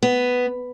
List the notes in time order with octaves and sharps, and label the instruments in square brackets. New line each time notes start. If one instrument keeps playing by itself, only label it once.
[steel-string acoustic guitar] B3